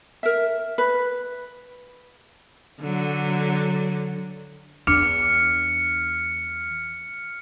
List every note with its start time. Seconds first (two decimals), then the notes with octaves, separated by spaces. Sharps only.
0.23 A#4 E5
0.78 B4
2.81 D3 F#3
4.87 E2 D4 F6 C#7